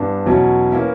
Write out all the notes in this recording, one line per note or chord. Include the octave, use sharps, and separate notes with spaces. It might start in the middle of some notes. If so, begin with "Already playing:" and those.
Already playing: G2 E3 B3 D4
E2 B2 F#3 C#4 E4
E3 A#3 C#4 E4